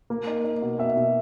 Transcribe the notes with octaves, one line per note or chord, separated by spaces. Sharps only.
A#3
D#4
D#4
B2
B2 E5
B2